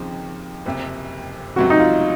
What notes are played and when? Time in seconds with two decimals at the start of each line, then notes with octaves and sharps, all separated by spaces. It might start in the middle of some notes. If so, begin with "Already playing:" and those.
Already playing: D#2 C#3 F3 C4 D#4
0.66 F#1 F2 C3
1.56 C#2 C3 F#3 C4 F#4
1.70 D#4
1.79 F4